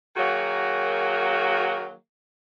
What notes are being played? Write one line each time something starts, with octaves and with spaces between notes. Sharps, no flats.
D#3 F#3 A#3 F#4 G#4